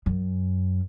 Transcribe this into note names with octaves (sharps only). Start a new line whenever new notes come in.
F#2